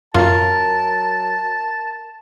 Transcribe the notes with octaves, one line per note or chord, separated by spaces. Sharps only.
F#2 F#3 F4 A#4 F5 A5